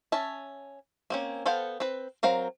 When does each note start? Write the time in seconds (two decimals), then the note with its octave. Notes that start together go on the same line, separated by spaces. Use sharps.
0.12 C#4 E5 A5
1.10 A#3 C4 C#4
1.46 B3 A4 C5 F5 G5
1.80 C4 B4
2.23 F#3 C4 A#4 F5